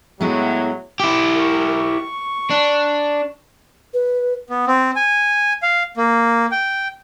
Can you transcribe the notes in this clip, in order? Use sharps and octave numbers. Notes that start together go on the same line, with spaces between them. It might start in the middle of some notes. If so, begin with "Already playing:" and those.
A2 F#3 G#3 B3 E4
E4 G4
A#4 C#6
C#6
D4
B4
B3
C4
G#5
F5
A#3
G5